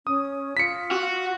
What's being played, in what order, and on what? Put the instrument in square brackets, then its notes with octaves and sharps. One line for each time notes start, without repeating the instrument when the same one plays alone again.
[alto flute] C#4 [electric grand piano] D#6
[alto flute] F4 [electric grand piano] B6 C#7
[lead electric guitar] F#4